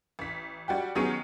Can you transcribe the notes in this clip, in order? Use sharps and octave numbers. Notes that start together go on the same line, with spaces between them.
A1 B6
G3 F#4 G4
D#3 F#3 B3 C#4 G#4 D#7